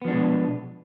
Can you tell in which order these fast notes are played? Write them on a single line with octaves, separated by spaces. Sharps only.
B3 F3 D4 G#3 B2